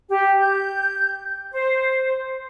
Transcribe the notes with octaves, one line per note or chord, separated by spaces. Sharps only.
G4
G6
C5